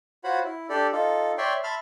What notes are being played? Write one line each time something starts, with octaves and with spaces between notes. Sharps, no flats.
F4 F#4 C5 C#5 F#5 B5
E4
D4 G4 A4 D5
D#4 F4 A4
C#5 D5 E5 G5 C6
E5 A5 B5 C6 F6